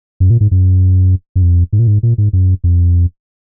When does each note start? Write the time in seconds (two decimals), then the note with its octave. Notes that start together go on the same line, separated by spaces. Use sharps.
0.20 F#2
0.30 A#2
0.41 G#2
0.51 F#2
1.36 F#2
1.42 F2
1.73 G#2
1.79 A#2
1.87 G#2
2.03 A#2
2.18 G#2
2.33 F#2
2.64 F2